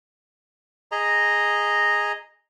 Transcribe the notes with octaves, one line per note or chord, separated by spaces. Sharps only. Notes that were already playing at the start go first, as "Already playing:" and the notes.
G#4 D#5 A#5